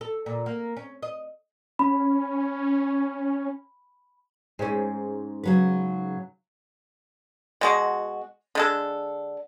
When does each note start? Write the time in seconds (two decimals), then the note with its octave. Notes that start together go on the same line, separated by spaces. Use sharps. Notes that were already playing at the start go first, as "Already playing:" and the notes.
0.01 A4
0.26 A#2
0.46 A#3
0.77 C#4
1.03 D#5
1.79 C#4 B5
4.59 G#2 C#4
5.43 C#3 F#3 B4
7.61 B2 G#3 F#4
8.55 D3 G#3 A4